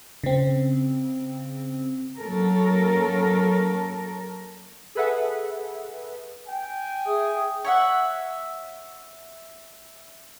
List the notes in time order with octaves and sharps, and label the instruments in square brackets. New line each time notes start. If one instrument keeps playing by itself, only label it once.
[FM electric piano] C#3 C4
[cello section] F#3 A#3 C#4 A4 A#4
[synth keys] G#4 A4 B4 E5 F#5
[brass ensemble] G5 G#5
[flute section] G#4 E5 D#6
[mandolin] C#5 E5 F#5